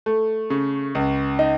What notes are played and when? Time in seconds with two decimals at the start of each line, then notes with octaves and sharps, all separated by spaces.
0.06 A3
0.50 C#3
0.95 C#2
1.39 D#4